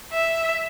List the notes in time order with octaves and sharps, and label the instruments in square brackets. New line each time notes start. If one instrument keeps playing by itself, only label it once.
[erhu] E5